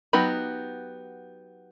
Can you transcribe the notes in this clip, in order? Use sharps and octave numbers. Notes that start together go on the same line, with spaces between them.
F#3 B3 D#4 G4 B5